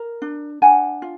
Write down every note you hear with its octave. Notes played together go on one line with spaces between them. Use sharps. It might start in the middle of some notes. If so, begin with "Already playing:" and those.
Already playing: A#4
D4
D4 F#5 G#5
F4